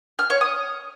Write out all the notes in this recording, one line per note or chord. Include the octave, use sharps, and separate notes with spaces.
F6
C#5
D#6